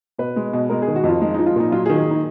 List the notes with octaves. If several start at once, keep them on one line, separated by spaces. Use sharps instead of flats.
B2 B4
G#3
B2
G#3 A#4
G#4
D#3
F#4
F2
F4
G#3 D#4
D#4
F3
F4
A#2 D#4
F#3 F4
G#4
D#3
G#4
D#4